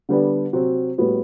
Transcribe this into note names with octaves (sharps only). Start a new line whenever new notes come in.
D3 G3 B3 D4
C3 F#3 C4 F#4
A2 G3 B3 F#4